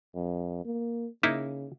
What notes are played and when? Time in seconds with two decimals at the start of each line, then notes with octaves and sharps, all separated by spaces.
0.15 F2
0.65 A#3
1.23 C#3 A#3 D#4 E4